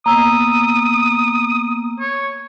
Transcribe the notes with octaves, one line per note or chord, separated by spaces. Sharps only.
A#3 B3 A#5 D#6 E6
C#5